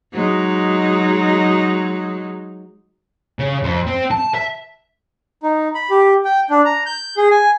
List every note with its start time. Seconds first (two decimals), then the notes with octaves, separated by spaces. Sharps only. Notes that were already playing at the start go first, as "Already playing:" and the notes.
0.13 F#3 G#3 D#4
3.39 C#3
3.63 F2
3.87 C4
4.11 A5
4.35 E5
5.43 D#4
5.75 B5
5.90 G4
6.25 G5
6.50 D4
6.65 A#5
6.86 G6
7.17 G#4
7.31 G#5